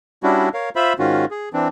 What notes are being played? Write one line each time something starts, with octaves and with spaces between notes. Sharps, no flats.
G3 C#4 D4 E4 F#4
A#4 C#5 F5
F4 C5 E5 B5
G#2 D#3 C#4 F4 F#4
G#4
E3 C4 D4